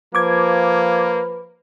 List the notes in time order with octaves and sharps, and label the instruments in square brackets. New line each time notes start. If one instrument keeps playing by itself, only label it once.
[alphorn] F3 [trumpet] A#3 [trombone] B4 [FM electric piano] D6 G#6